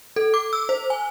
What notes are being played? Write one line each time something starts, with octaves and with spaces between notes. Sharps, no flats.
A4
D6
E6
C5
G#5